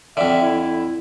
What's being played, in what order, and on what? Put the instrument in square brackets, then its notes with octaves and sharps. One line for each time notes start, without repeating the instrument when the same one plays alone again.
[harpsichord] F2 D3 [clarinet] E5
[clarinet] E4